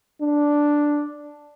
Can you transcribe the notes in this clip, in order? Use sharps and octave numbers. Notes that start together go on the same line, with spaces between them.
D4